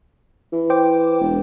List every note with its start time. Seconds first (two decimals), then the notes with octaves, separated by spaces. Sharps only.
0.52 E3
0.70 C5 G5 D6
1.21 E1